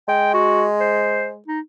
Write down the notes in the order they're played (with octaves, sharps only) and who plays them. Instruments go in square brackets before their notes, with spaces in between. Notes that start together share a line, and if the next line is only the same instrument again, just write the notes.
[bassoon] G#3 [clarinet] G5
[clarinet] F#4
C5
D#4